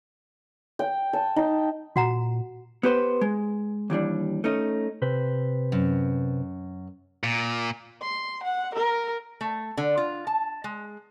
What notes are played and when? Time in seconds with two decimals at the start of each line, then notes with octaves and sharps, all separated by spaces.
0.79 G5
1.13 A5
1.36 D#4
1.96 A#2 F#4 F#5 A#5
2.83 B3 G4 B4 C5
3.21 G#3
3.90 D#2 E3 G3 D4
4.44 A3 C#4 D#4
5.02 C3 B4 C5
5.72 F#2
7.24 A#2
8.02 C6
8.44 F#5
8.75 A#4
9.41 A3
9.77 D3
9.97 F4
10.27 A5
10.64 G#3